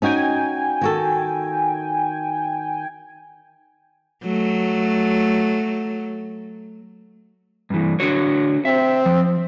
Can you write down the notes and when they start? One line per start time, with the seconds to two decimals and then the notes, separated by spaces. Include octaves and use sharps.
0.02 C#4 D#4 F#4 G5 G#5
0.81 D#3 F#4 A4
4.24 F#3 A3
7.70 G2 E3
8.00 D3 F#4 C#5
8.65 C4 E5
9.06 F3